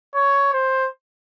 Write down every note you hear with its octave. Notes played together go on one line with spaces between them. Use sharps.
C#5
C5